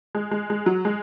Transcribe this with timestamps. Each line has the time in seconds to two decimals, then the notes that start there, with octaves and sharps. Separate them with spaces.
0.15 G#3
0.31 G#3
0.50 G#3
0.66 F#3
0.85 G#3